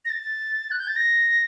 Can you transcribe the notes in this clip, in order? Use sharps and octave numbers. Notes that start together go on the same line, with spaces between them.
A#6
A6
F#6
G6
A6
A#6